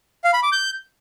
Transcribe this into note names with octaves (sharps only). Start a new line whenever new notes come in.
F5
B5
D6
G6